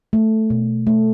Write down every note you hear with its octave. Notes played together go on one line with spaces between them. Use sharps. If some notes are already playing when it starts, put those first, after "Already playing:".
A3
B2
A3